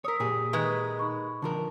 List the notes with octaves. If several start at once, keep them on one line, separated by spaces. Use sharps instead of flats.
A#4 C#5 D#6 E6 B6
A#2 G4 G#4
D#3 G#3 B4
D#4 B5 C#6
D3 F3 A#4 A5